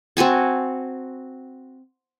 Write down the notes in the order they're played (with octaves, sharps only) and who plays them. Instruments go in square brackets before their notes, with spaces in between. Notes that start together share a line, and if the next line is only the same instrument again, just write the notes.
[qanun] C4 F#4 G#5 A5